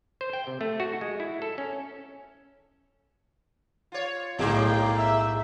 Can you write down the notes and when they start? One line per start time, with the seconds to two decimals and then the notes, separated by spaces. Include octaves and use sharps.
0.21 C5
0.33 G5
0.47 C3
0.61 A3
0.80 F#4
1.01 G#3
1.20 E4
1.42 A4
1.58 C#4
3.92 F4 C#5
4.38 B1 A2 G3 G#3 A#3 D5 F5 G5
4.98 E5